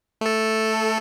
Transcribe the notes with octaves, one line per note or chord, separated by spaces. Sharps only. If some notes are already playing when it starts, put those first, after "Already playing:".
A3 A4